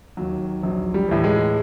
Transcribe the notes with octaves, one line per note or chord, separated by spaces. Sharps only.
D#2 D#3 F#3
A#1 F#3
G3
A2 E3
G#3